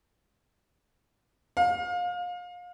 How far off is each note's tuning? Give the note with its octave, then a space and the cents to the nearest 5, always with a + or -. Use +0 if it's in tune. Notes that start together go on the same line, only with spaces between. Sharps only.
F5 +30